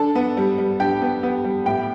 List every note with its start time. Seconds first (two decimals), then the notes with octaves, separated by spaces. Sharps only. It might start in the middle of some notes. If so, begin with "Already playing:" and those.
Already playing: D4 A4 A5
0.15 B3
0.37 G3
0.58 G3
0.80 D4 G4 G5
1.02 B3
1.23 B3
1.44 G3
1.66 A2 G4 G5